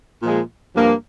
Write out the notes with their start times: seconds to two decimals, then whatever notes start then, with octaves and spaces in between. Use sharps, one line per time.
0.22 A#2 F3 G#3
0.74 G2 F3 A#3